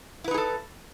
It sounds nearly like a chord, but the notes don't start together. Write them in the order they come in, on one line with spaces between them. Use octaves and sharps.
E4 B4 D#4 G#4 A4